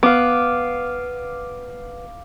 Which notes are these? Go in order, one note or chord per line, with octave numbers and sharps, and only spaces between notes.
B3 F5 D6